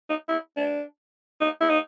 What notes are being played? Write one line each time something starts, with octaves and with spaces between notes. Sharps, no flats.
D#4
E4
D4
D#4
E4
D#4